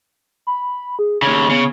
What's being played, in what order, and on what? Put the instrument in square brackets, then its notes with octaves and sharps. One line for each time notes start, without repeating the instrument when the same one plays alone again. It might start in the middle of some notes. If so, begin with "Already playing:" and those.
[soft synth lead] B5
G#4
[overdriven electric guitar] D#2 C#3 [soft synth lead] G#6
[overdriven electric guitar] C#3 [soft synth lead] B3